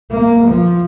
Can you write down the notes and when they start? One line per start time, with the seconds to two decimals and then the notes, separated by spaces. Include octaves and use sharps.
0.12 A#3
0.46 F3